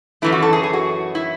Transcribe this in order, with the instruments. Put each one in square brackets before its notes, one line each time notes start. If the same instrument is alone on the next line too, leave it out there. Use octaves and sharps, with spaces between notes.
[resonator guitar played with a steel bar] F#2 E3 A3 E4
F#4
A4
G#4
G#4
F#4
E4